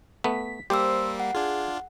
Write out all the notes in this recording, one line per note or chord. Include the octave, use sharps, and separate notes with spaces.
A3 B3 B6
G3 A#3 G4 C5 C6 E6
F#5
D4 F4 G#4